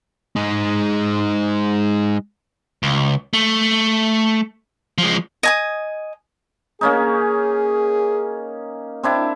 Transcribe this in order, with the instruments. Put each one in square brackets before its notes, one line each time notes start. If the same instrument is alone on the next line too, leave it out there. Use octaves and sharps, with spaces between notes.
[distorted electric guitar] G#3 D#4
[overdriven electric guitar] C#2
A3
F3 G#3
[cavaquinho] D#5 G#5 D#6
[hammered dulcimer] A#3 C#4 D#4 [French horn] G#4
[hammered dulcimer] C4 D4 E4